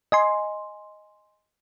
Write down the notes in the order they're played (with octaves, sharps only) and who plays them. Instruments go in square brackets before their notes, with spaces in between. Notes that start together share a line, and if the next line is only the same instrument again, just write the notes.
[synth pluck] D#5 G#5 C6